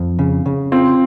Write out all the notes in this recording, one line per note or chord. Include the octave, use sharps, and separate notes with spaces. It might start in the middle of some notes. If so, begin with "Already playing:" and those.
Already playing: F2
C#3
C#3
C4 F4